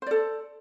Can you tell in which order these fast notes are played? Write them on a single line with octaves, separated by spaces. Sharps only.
C5 D5 A4